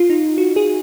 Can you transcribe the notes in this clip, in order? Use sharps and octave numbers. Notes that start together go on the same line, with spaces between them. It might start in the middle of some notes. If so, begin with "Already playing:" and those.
Already playing: F4
D#4
F#4
G#4